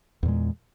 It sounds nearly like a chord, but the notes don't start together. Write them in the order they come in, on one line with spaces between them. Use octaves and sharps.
E2 A#2 G#3